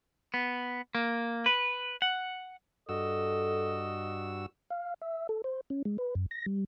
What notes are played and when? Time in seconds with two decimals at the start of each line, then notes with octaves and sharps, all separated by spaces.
0.34 B3
0.95 A#3
1.46 B4
2.02 F#5
2.89 G2 F#4 A4 D#5 E6
4.70 F5
5.02 E5
5.29 A4
5.44 C5
5.70 C#4
5.85 G#3
5.98 B4
6.15 F#2
6.31 A#6
6.46 G3